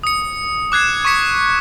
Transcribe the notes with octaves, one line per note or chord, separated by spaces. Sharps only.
D#6 C#7
D6 F#6 G#6 C7 E7
C#6 D6 B6 C#7